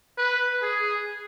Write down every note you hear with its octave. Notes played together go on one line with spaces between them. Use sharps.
B4
G#4